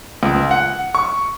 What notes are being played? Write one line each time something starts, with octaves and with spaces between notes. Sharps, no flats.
C#2
F#5
C#6